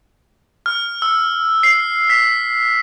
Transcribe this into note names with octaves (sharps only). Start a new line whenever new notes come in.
F6
E6
C7
B6